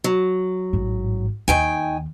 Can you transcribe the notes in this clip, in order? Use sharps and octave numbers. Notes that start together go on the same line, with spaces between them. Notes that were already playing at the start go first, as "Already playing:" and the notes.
F#3
A1 G#2
D#2 D#3 G5 G#5